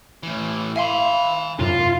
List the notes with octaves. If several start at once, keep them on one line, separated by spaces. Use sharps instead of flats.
A2 E3
E5 F5 G#5 B5 C6
F#2 C3 F4